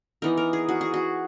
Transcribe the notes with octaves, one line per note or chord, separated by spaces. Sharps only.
E3 B3 D#4 A#4
A#4
G#4
F#4
G#4
F#4